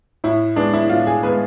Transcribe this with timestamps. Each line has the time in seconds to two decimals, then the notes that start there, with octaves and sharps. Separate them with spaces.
0.24 A2 E4
0.56 G#3 B3 D4
0.73 E4
0.90 A2 F4
1.07 G#4
1.23 G#3 B3 B4